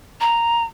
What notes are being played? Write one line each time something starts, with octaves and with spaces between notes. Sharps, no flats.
A#5